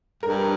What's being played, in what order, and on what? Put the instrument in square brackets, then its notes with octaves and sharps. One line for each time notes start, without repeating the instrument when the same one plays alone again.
[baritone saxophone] G2 [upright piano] A#4